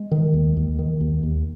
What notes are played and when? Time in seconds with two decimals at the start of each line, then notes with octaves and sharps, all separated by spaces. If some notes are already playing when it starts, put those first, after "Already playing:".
Already playing: G#3
0.12 D#3
0.34 D#2
0.57 D#2
0.79 D#3
1.01 D#2
1.23 D#2